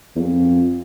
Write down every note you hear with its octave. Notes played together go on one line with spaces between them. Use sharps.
E2
F2